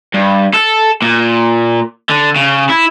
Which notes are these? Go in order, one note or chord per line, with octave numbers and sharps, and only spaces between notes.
G2
A4
A#2
D3
C#3
E4